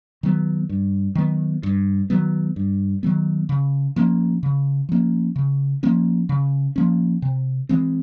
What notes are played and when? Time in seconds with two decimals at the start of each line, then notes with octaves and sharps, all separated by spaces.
0.23 D#3 F#3 B3
0.69 G2
1.15 D#3 F#3 B3
1.63 G2
2.10 D#3 F#3 B3
2.56 G2
3.03 D#3 F#3 B3
3.49 C#3
3.96 F3 A#3 C#4
4.43 C#3
4.89 F3 A#3 C#4
5.36 C#3
5.83 F3 A#3 C#4
6.29 C#3
6.76 F3 A#3 C#4
7.22 C3
7.69 E3 G#3 C4